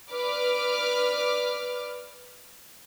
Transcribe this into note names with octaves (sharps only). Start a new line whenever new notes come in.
B4 D5 D6 F6